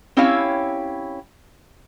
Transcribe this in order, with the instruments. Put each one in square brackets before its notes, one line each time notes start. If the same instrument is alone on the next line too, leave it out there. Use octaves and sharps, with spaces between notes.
[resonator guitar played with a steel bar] C4 C#4 E4 G4 C#5 F5